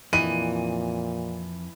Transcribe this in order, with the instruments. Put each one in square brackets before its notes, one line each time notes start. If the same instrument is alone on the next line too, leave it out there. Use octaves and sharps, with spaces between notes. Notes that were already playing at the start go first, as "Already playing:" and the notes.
[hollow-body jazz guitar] F2 D#5 [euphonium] A#2 [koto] E3 [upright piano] D#7